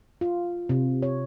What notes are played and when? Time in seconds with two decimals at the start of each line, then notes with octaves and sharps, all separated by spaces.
0.21 F4
0.69 C3
1.02 C#5